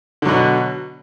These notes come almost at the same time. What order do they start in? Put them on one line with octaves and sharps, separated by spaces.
D3 F#3 B2